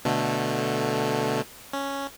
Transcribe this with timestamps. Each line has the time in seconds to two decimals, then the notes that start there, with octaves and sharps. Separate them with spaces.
0.05 B2 D3 A3
1.73 C#4